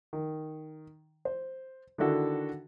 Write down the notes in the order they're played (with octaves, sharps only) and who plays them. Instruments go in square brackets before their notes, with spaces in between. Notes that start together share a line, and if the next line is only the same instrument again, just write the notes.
[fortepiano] D#3
C5
D3 D#3 D4 E4 F#4 A4